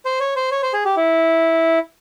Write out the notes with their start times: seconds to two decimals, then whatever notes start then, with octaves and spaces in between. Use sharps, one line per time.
0.05 C5
0.20 C#5
0.36 C5
0.51 C#5
0.62 C5
0.73 G#4
0.85 G4
0.97 E4